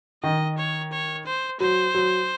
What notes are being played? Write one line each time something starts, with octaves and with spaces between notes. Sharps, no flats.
D#3 D#5
C#5
C#5
C5
F#3 C5
F#3